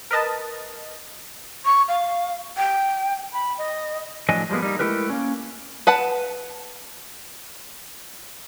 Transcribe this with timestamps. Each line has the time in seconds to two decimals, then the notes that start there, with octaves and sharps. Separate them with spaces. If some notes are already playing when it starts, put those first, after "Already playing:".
0.11 A#4 B4 D#5 A5
1.65 C#6
1.88 F5
2.57 G5
3.33 B5
3.58 D#5
4.29 A2 F3 F#3 D4 D#5 G#5
4.50 F3 G3 G#3 A#3 B3
4.62 G3 A#3 D#4
4.79 G#3 A3 E4 G4 A#4 B4
5.10 A#3 C#4
5.87 B4 F#5 A5